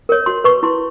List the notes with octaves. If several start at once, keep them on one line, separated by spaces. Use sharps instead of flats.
A#4 C#5
F#4 C6
B4 C#6
E4 C6